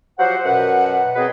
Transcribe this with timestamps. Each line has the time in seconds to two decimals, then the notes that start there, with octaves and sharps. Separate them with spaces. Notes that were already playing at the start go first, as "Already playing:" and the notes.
0.19 F3 F#3 G4 C5 F#5
0.45 F#2 B2 B4 F#5
1.16 F#3 B3 C4 G#4 B4 D#5